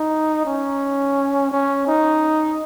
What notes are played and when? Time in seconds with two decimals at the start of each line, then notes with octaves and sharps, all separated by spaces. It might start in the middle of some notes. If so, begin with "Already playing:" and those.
Already playing: D#4
0.45 C#4
1.51 C#4
1.87 D#4